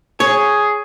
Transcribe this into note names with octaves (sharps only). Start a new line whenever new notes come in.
G#4 C#5